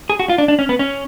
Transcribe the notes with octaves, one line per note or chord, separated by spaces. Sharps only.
G#4
F#4
F4
D4
D4
C#4
B3
C#4